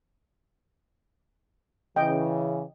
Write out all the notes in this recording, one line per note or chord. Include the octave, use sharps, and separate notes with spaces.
C#3 E3 D#5 G5